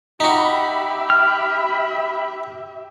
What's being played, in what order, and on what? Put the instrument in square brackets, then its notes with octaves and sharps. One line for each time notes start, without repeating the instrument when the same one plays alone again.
[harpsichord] D#4 F#4 [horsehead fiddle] G4 E5 [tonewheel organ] B5
[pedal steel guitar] F6